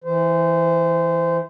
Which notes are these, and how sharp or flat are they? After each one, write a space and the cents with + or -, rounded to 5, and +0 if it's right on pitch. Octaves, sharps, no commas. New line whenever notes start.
E3 +0 C5 -25